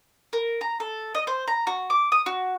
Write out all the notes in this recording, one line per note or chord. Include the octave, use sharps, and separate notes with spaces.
A#4
A#5
A4
D#5
C5
A#5
F#4
D6
D#6
F#4